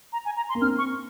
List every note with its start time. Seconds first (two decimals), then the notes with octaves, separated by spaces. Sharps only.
0.13 A#5
0.25 G#5
0.37 A#5
0.49 C6
0.55 A#3
0.62 C4 F6
0.78 C#6